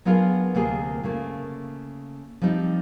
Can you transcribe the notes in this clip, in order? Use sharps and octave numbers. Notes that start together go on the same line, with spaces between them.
F#3 B3 D4 F4 G#4 A#4
D2 C3 A#3 C4 F4 G#4
C#3 A3 A#3
F3 G3 C4 D#4